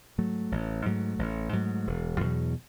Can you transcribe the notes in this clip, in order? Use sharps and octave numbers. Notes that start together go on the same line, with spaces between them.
G#2 F#3 A3
A1
G#2 F#3 A3
A1
G#2 F#3 A3
E1
E2 B2 F#3